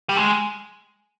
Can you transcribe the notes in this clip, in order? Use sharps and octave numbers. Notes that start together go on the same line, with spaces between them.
G3
G#3